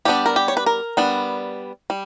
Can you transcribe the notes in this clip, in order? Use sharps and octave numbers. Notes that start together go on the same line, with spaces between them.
G3 B3 D4 G4
A#4
G4
C#5
B4
A#4
G3 B3 D4
G3